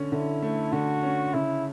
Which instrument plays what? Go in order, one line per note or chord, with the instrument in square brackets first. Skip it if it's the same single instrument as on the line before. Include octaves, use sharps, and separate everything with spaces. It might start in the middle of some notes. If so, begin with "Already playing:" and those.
Already playing: [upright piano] D3 C#4
[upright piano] D3 [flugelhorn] E4
[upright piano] A3
[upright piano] D3 [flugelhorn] F#4
[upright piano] C#4
[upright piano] C#3 [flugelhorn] E4